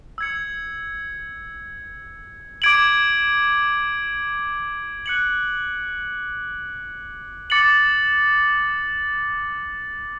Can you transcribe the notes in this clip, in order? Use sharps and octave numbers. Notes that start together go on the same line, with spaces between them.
E6 G#6 C#7
D6 G#6 D7 F#7
F#6 C#7 F#7
D6 A6 C#7 F#7